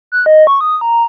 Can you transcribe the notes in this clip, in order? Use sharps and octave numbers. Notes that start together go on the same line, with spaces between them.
F#6
D#5
C#6
D#6
A#5